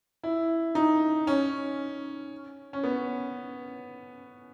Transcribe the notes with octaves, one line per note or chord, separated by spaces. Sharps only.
E4
D#4
C#4
C#4
B3